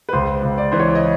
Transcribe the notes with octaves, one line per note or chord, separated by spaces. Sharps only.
B4
C#2 C5
C#2
D5
E3 C5
C#5
D5
D#5